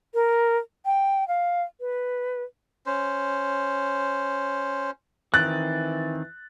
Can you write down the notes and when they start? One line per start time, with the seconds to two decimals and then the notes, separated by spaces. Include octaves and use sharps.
0.14 A#4
0.85 G5
1.28 F5
1.80 B4
2.86 C#4 C5
5.34 D#3 E3 C4 F#6 A6